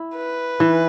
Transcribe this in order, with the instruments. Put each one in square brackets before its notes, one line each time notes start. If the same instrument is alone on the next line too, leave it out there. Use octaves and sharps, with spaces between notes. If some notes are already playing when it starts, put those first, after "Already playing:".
Already playing: [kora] E4
[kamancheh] B4
[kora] E3